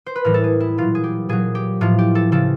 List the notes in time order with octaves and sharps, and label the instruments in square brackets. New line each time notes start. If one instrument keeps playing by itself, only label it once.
[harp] C5
B4
A2 E3 G3 A#4
A4
G#4
E4
A#2 F#3 F4
G#4
G4
A#2 F#3 G#4
G4
A2 F3 F4
G4
A4
C#3 F3 A4